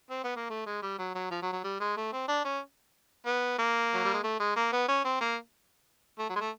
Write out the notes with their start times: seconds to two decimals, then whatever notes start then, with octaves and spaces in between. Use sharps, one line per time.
0.10 C4
0.24 B3
0.36 A#3
0.50 A3
0.66 G#3
0.82 G3
0.99 F#3
1.15 F#3
1.31 F3
1.42 F#3
1.52 F#3
1.64 G3
1.80 G#3
1.97 A3
2.12 C4
2.28 D4
2.45 C#4
3.26 B3
3.59 A#3
3.94 F#3
4.05 G3
4.14 G#3
4.23 A3
4.40 G#3
4.56 A#3
4.72 B3
4.88 C#4
5.05 C4
5.21 A#3
6.19 A3
6.29 F#3
6.35 G#3
6.40 A3